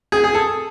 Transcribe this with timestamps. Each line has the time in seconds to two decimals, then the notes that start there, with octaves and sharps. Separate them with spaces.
0.12 G#4
0.24 G#4
0.34 A4